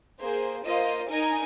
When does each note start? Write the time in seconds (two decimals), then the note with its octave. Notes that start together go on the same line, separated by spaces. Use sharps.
0.20 A#3 G#4 C5
0.65 A#3 F4 C5 D#5
1.09 D#4 A#4 D#5 G#5